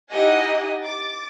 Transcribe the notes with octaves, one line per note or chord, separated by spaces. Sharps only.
D#4 E4 G4 D#5 F#5 G#5
D6 A6